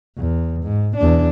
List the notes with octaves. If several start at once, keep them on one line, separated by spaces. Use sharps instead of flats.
E2
G#2
E2 D4